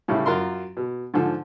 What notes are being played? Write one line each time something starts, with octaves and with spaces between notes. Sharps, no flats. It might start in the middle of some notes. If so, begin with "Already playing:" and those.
A2 C#3 G3 E4
F#2 F4 A#4 C6
B2
G#2 D3 F3